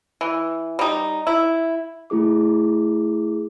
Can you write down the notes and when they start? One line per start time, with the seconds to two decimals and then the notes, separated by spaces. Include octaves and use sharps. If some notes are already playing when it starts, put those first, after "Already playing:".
0.21 E3
0.79 G3 D#4
1.27 E4
2.10 A3 E4 G#4 D6